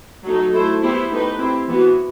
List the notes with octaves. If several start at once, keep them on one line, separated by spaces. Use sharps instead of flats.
F#3 A3 D#4
A3 E4 A4 C5
B3 E4 G4 C5
A3 D#4 G4 B4
C4 E4 G4
E3 B3 F#4